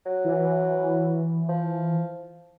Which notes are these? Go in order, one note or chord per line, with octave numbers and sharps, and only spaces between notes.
F#3
E3
F3